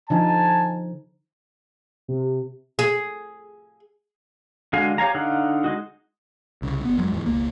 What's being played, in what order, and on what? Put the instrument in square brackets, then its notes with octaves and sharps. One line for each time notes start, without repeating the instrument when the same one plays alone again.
[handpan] D3 F3 D#4 [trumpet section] G#5 A5
[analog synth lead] C3
[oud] G#4
[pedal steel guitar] D3 G#3 F#4 F5 G#5
G4 C#5 F5 G#5 A#5
D3 D#4 F5 F#5
G#3 D#4 F#4
[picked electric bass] C2 C#3
G1 B3
F#2 F#3 G#3
E2 G#2 D#3 E3
E1 C#2 A#3